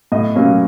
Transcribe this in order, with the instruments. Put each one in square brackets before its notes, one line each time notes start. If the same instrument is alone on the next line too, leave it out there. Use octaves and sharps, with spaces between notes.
[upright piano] A2 D#5
F#3 A#3 C#4